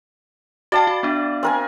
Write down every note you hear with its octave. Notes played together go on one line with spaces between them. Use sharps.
F#4 D5 F5 G5 A5
F#4
B3 D4
C4 A#4 G#5